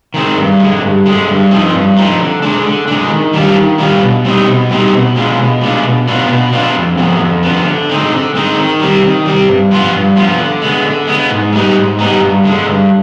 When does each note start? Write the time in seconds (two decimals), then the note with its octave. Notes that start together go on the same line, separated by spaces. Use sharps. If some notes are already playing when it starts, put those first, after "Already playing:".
0.14 D#3 G#3 C4
0.37 G2
0.59 D3 G#3
0.83 G2
1.06 D3 G#3
1.28 G2
1.51 F3 C4 D#4
1.74 G2
1.96 F3 C4 D#4
2.19 D3
2.42 G#3 D4
2.65 D3
2.88 G#3 D4
3.10 D#3
3.33 G3 D4 F4
3.57 D#3
3.78 G3 D4 F4
4.01 B2
4.24 G3 C4 D#4
4.47 B2
4.70 G3 C4 D#4
4.93 B2
5.16 G#3 D4 F4
5.38 B2
5.61 G#3 D4 F4
5.84 B2
6.07 B3 D4 F4
6.29 B2
6.52 B3 D4 F4
6.76 F2
6.98 D3 F3 B3
7.20 F2
7.43 D3 F3 B3
7.66 D3
7.89 G#3 C4 D#4
8.11 D3
8.35 G#3 C4 D#4
8.57 D#3
8.80 G3 C4
9.03 D#3
9.25 G3 C4
9.49 G2
9.71 F3 B3 F4
9.94 G2
10.16 F3 B3 F4
10.39 D3
10.62 G#3 B3
10.85 D3
11.07 G#3 B3
11.30 G#2
11.53 G3 B3 D#4
11.76 G#2
11.99 G3 B3 D#4
12.21 G2
12.44 D3 G#3
12.67 G2